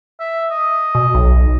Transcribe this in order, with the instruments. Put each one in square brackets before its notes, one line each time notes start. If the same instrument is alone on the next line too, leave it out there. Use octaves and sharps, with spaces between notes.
[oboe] E5
D#5
[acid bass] B2
B1